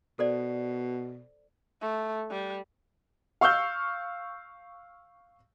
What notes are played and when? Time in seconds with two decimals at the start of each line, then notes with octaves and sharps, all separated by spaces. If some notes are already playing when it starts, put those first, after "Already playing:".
0.19 B2 A4 C5 D5
1.82 A3
2.31 G3
3.41 F5 C#6 E6 F6 G6